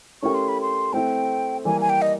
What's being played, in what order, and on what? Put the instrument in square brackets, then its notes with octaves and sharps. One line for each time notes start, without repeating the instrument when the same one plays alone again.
[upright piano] A3 C#4 E4 G4 A#4 [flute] C#6
[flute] C6
B5
C6
[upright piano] A3 C4 E4 [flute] G5
[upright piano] E3 G3 A#3 [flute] G#5
[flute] G#5
G5
D#5